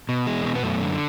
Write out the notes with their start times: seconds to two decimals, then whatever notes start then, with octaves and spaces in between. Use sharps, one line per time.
0.09 B2
0.27 E2 G#3
0.45 B2
0.56 B3
0.63 F#2 A3
0.81 D3